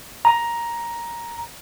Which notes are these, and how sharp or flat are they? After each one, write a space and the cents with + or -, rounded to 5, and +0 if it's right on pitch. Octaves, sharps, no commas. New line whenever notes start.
A#5 +10